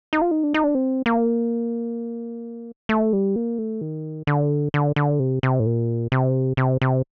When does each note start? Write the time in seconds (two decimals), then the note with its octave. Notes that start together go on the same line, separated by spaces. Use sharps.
0.13 D#4
0.22 F4
0.31 D#4
0.43 D4
0.54 D#4
0.64 D4
0.75 C4
1.06 A#3
2.89 A3
3.13 G3
3.36 A#3
3.58 A3
3.81 D#3
4.27 D3
4.74 D3
4.96 D3
5.19 C3
5.43 C3
5.60 A2
5.66 A#2
6.12 C3
6.57 C3
6.82 C3